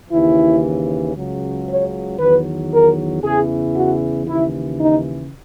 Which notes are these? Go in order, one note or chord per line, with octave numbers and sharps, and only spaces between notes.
D#2 C#3 E3 E4
C#2 C#3 F#3
C#5
E2 D#3 F#3 B4
A#4
E2 C#3 E3 G#4
F#4
D#2 C#3 E3 E4
D#4